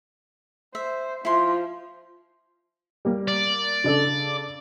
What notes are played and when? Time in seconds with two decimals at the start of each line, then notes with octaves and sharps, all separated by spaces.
0.75 C5 E5
1.25 F3 E4 C6
3.05 G3 A#3
3.28 D5
3.84 C#3 D4 A4